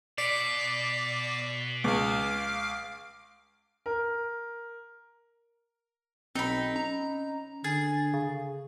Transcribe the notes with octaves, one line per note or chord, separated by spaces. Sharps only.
B2 D5 B6 C7 D7
C#2 F5 D6
A#4
B1 C4 D#4 B5
C#4 A#5
D3 G#4 A6
C#3